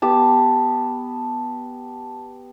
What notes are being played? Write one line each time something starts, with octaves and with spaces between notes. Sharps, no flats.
B3 G4 A5